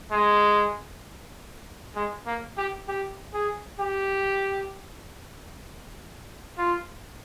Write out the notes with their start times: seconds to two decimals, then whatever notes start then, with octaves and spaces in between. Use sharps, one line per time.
0.11 G#3
1.95 G#3
2.26 A#3
2.57 G4
2.88 G4
3.34 G#4
3.80 G4
6.58 F4